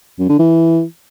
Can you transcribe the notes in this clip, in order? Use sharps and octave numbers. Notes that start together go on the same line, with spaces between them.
F#2
D3
E3